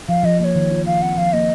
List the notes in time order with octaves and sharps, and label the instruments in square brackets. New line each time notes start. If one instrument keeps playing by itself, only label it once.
[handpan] F3 [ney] F5
[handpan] F3 [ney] D#5
[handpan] A#3 [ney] C#5 D#5
[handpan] D#3
F4
[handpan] F3 [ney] F5
[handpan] C4 [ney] F#5
[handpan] F3 [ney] F5
[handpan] A#3 [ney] D#5